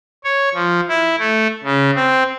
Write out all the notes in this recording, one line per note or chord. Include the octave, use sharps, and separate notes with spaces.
C#5
F3
E4
A3
C#3
C4